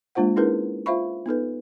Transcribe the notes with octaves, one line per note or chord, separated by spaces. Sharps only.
G#3 A#3 D4 F4 C5 F#5
C#4 D#4 E4 G#4 A#4 B4
F4 C5 E5 F5 B5 C#6
B3 D#4 A4 B4